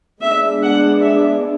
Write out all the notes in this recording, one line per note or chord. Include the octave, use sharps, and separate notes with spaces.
G#3 B3 D4 E5
F#5
E5